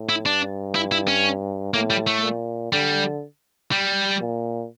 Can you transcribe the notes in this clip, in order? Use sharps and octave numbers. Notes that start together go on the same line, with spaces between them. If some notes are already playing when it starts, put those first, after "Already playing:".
Already playing: A2
E4
G2 D4
E4
E4
C#4
A2 A#3
G3
A3
A#2
D3 G3
G3
A#2